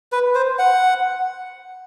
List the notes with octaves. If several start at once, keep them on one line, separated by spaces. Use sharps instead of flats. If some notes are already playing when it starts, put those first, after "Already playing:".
B4
C5
F#5